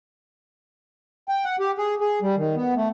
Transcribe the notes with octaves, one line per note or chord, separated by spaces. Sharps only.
G5
F#5
G4
G#4
G#4
G3
D#3
B3
A3